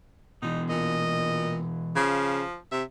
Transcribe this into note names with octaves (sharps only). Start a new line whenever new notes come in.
B2 E3 D#4
A#2 D#5
C#3 F3
C3 E5